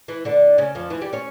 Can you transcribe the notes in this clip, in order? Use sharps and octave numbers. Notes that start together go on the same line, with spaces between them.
E3 E4
D3 D4
C#3 C#4
F2 F3
E3 E4
G3 G4
C#4 C#5